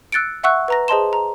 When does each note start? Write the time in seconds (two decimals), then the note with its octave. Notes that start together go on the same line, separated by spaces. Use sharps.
0.12 E6 F#6 A6 C#7 D7
0.43 E5 F#5 C#6 E6 F#6
0.68 B4 A#5 A#6
0.88 G#4 C5 D#5 A5 C6 E7
1.13 A#5